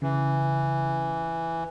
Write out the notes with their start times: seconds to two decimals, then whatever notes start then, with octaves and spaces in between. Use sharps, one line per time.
0.02 C#3 E3